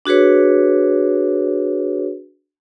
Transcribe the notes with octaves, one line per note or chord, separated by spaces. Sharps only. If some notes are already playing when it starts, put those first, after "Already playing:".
D4 F#4 G#4 B4 C#5